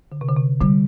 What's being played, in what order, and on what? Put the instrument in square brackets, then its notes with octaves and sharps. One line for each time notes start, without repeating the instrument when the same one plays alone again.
[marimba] D3
C3
D3
C3
[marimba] D3 [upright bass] G3